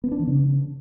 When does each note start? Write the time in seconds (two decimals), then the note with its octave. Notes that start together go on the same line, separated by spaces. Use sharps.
0.04 B3
0.11 D4
0.19 E3
0.27 C#3